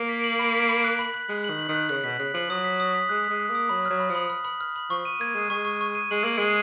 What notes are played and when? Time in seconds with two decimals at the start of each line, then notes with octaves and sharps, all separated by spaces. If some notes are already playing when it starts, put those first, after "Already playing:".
Already playing: A#3
0.09 B6
0.24 F#7
0.39 B5
0.54 B6
0.69 B5
0.84 F#6
0.99 B5
1.14 F#6
1.29 G#3 F#6
1.44 F#7
1.50 D#3
1.59 F#7
1.69 D#3
1.74 F#6
1.89 C#3 F#6
2.04 B2 B6
2.19 C#3 F#6
2.34 F3 F#7
2.49 F#3 D#6
2.64 B6
2.80 D#6
2.95 B6
3.09 G#3 F#6
3.24 B6
3.30 G#3
3.40 D#6
3.50 A#3 D#6
3.69 F#3 B5
3.86 F#3 F6
4.00 B5
4.10 F3
4.15 B5
4.30 B5
4.45 B5
4.61 F6
4.76 B5
4.90 F3 C#6
5.05 D#7
5.20 A#3 G#6
5.35 G#3 D#7
5.50 G#3 C#6
5.65 C#6
5.81 C#6
5.95 D#7
6.11 G#3 F#7
6.24 A#3 F#7
6.38 G#3 F#7